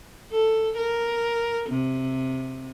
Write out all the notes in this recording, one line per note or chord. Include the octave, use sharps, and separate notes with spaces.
A4
A#4
C3